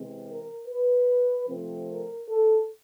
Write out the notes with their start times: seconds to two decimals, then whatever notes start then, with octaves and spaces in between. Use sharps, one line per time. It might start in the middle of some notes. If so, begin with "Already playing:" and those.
Already playing: C3 E3 G#3 C4
0.26 A#4
0.67 B4
1.48 C3 F3 A3 C4
1.88 A#4
2.29 A4